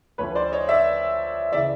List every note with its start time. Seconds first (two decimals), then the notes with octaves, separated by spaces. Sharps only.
0.18 D2 D3 F3 B4 C#5
0.35 C5 D5
0.52 C#5 D#5
0.69 D5 E5
1.52 C#3 E3 D5 E5